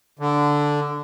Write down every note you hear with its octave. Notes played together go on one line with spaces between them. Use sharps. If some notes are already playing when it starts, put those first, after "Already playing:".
D3